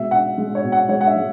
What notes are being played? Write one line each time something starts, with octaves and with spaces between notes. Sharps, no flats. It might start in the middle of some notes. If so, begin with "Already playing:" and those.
Already playing: B2 G#3 E5
B2 F#5
G#3
C#5
B2
F#5
G#3 C#5
F#5
E5
G#3